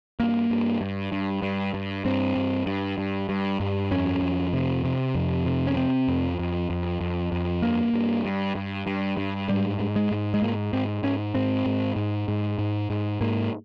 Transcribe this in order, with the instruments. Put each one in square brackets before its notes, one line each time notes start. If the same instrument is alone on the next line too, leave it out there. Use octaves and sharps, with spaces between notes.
[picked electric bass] G2 A#3
G2
G2
G2
G2
G2
G2 C4
G2
G2
G2
G2
G2
F2 C#4
F2
C3
C3
F2
C3
C#4
C3 C4
F2
F2
F2
F2
F2
G2 A#3
G2
G2
G2
G2
G2
G#2 G3
G#2
G#3
G#2
G#3
G#2 A#3
G#2 C4
G#2 C#4
G#2 C4
G#2
G#2
G#2
G#2
G#2
G#2 A#3